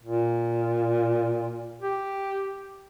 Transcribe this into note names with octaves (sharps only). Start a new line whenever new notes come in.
A#2
G4